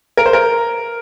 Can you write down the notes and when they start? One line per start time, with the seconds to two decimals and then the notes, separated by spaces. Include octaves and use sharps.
0.17 A#4
0.26 C5
0.33 A#4